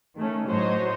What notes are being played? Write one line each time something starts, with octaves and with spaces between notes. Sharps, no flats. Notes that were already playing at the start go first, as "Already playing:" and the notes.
D#3 A3 C#4
A2 F#3 C5 C#5 D#5